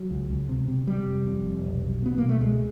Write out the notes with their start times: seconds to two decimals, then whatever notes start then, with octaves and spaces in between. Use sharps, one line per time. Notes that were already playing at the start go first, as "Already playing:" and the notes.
Already playing: F#3
0.11 C#2
0.30 C#2
0.49 C3
0.68 C3
0.87 C3 G3
1.06 F1
1.26 F2
1.44 F1
1.65 B1
1.83 B1
2.02 B2 B3
2.18 B2 A#3
2.29 A3
2.41 C#2 G#3